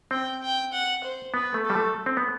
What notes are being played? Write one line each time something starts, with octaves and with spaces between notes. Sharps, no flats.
C4 G5
G5
F#5
C5
B3 B4
A3
G3 A4
A3
C4
B3